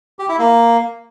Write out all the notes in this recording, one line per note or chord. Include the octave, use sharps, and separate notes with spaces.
G4
E4
A#3